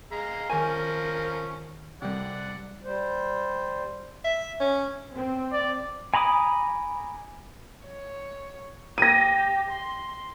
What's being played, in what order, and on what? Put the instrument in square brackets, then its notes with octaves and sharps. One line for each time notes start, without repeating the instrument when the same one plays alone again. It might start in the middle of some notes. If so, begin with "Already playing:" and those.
[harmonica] G#3 F5 A#5
[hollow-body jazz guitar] D#3 G#5 [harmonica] F3 C#4 A#4
[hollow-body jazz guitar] C3 G3 [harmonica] D5 F#5
[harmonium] G3 C5
[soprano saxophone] E5
C#4
[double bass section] C4
[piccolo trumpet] D5
[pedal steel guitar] G#5 A#5 B5 D6 D#6
[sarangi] C#5
[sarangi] G4 [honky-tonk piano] A#6 D#7
[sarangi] C6